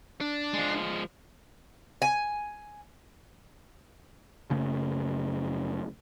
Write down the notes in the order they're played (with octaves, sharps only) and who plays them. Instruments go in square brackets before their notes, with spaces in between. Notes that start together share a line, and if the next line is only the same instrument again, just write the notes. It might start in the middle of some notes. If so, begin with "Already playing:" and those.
[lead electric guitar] D4
[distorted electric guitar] F3 G#3
[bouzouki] G#5
[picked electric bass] F#1 C#3 A3